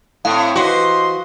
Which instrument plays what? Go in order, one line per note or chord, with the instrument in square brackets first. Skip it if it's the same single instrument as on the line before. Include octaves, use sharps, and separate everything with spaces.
[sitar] A2 [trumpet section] C4 C#5 [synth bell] F5
[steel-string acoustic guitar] E3 C5 [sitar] F#4 [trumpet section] G4 D#5 C6